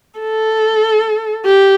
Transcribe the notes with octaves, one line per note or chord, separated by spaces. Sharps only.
A4
G4